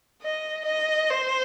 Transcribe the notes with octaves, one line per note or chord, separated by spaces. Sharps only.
D#5
D#5
C5